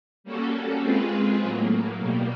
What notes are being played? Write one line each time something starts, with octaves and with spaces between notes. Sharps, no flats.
G3 A#3 C#4 F#4 A4
G#3 C4 F4 G#4 B4
A2 F#3 A#3
B2 G3 A#3